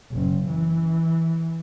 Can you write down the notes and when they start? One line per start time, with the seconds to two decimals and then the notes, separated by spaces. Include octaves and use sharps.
0.11 F#1
0.49 E3